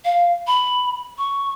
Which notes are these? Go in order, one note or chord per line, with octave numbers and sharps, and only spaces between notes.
F5
B5
C#6